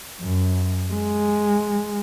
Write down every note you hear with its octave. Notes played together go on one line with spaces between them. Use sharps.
F#2
G#3